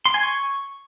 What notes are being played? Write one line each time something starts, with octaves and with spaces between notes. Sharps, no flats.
C6
G#5
C#6